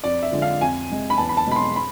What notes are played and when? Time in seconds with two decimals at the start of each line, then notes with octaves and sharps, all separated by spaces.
0.04 F2 D5
0.23 E5
0.32 D3 F3 G#3
0.42 F5
0.61 F2 G#5
0.90 C3 G#3
1.10 B5
1.18 E2 A5
1.29 B5
1.37 A5
1.47 B2 G#3 B5
1.56 C6
1.76 B5